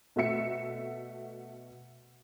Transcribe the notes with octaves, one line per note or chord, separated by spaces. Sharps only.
B2 A3 F#4 E5 C#7